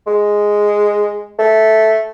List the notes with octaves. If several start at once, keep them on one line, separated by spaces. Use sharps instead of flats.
G#3
A3